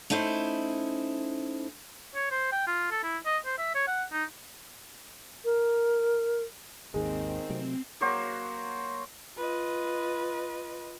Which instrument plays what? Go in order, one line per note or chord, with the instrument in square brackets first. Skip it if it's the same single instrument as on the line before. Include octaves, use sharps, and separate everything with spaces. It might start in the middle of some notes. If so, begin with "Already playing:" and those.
[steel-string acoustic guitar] A3 C#4 D#4 E4 C5
[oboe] C#5
C5
G5
F4
A4
E4
D#5
C5
E5
C#5
F#5
D#4
[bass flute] A#4
[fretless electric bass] G#1 D#2 [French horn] D#3 [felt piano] G#3 [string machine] C4
[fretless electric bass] C3 F#3 A3
[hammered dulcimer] F#3 A#3 F#4 C5
[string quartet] F4 B4 D#5